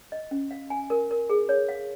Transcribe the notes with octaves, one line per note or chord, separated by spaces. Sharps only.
D#5
C#4
F5
G#5
A#4
A#4
G#4
C#5
F5